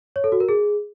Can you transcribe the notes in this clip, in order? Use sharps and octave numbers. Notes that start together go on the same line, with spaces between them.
C#5
A4
F#4
A#4
G#4